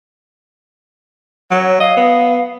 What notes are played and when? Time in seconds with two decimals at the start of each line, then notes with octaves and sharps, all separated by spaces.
1.51 F#3 C#5
1.80 D#5 F5
1.97 B3